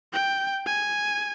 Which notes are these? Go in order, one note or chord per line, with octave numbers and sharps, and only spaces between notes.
G5
G#5